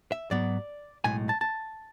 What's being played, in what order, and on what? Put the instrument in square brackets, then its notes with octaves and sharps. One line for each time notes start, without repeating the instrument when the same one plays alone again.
[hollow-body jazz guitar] E5
G#2 F#3 B3 D5
B1 A2 G#3 G#5
A5
A5